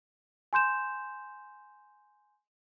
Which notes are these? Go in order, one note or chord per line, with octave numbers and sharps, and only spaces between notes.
G#5 C6 G6 E7